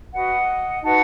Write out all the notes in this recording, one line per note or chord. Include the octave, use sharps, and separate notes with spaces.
F#4 B4 D#5 F#5
D#4 F#4 B4 F#5 A5